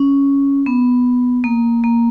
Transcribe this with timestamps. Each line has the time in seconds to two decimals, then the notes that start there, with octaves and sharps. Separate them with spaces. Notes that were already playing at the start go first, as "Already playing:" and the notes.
Already playing: C#4
0.66 B3
1.44 A#3
1.84 A#3